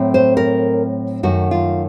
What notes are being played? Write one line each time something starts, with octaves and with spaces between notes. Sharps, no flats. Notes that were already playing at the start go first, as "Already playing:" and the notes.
Already playing: A2 F#3 A3 C4
C5
A#4
F#2 D#3 A3 F#4
F4